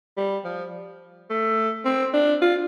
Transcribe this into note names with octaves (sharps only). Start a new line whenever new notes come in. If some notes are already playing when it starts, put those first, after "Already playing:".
G3
F3
A3
C4
D4
F4